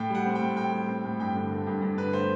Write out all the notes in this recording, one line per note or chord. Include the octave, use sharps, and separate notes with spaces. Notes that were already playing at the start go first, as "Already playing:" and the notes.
Already playing: A2 G5
G3 F#5
C4
G5
A2
A2 G5
G3
C4
A2
G2 G5
D3
A3
G2
G2
D3 B4
A3 C5